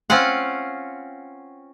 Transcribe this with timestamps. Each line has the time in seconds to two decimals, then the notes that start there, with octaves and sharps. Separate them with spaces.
0.10 C4 C#4 F4 F5 F#5